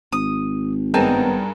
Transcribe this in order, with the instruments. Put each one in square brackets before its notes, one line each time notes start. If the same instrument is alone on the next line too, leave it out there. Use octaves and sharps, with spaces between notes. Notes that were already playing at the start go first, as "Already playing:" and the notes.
[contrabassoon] G#1 [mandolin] D#6
[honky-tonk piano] G2 G#4 A#4 [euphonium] B3 [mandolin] C4 D#4 A5